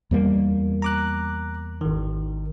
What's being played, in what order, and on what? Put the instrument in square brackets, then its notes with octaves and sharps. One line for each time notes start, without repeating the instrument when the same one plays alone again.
[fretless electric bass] E2 G3 A#3
[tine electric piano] A#5 D6 F#6
G#1 D#3